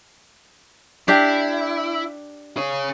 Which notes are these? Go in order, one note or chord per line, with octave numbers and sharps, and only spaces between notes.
D4 E4 G4
G#4 C#5